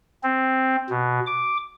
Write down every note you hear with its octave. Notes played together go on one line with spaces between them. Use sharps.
C4
B2
D6